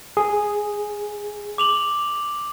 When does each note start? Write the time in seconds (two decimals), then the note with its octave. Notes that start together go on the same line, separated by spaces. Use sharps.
0.17 G#4
1.58 D6 F7 F#7